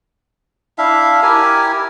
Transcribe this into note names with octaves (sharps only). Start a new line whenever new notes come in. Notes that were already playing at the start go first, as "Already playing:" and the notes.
D4 E4 E5 F5
E4 G4 A#4 G#5